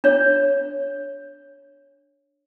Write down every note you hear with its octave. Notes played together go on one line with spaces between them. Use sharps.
D4 C#5